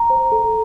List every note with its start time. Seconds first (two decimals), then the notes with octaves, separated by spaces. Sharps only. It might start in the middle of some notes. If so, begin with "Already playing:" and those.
Already playing: A#5
0.10 C5
0.32 A4